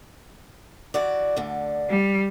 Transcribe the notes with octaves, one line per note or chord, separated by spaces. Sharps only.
E3 F#4 D5
D2 D3
G3